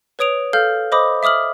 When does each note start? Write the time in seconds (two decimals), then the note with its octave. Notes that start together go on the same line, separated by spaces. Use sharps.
0.19 B4 C#5 D#6 D7 F7
0.53 A4 F5 F6 G6
0.92 C5 D#5 B5 D6 D#6
1.23 E5 D6 D#6 F6 F#7